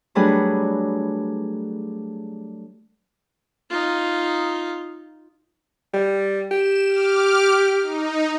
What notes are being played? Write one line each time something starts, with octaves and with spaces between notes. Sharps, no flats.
F#3 G3 A3 D4 G#4 B4
D#4 F4
G3
G4 E7
D6 F6
D#4